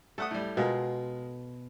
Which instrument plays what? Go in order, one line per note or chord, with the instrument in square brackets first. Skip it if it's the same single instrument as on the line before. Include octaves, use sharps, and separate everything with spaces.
[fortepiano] A3 F#5 D#6 [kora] A4
[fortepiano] A2 G3
[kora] B2 [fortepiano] G#3 F4 A#4